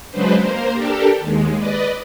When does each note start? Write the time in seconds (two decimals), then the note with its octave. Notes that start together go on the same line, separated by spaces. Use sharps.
0.11 C#3 F#3 G#3 D4 B4 C5
0.40 A#3 A#4 C5
0.72 D4 G4 A4 A#4
1.20 D#2 G#3
1.58 B4 D5 D#5